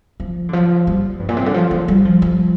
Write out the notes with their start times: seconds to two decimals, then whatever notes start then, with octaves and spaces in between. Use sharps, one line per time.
0.20 F3
0.49 D3
0.53 F3
0.87 G3
1.20 G2
1.29 A#2
1.37 C3
1.46 D3
1.54 F3
1.71 F3
1.88 G3
2.05 F3
2.22 F3